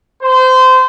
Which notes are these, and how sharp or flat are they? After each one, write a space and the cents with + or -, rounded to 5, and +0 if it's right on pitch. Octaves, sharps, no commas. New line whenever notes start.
C5 -25